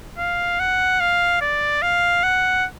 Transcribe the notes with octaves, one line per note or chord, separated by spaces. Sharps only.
F5
F#5
F5
D5
F5
F#5